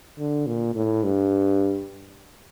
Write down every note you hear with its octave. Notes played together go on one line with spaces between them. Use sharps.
D3
A#2
A2
G2